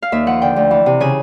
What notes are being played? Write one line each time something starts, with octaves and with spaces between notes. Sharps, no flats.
F5
D#2 E5
F3 F#5
D3 G5
D2
E3
C3
C#3 G#5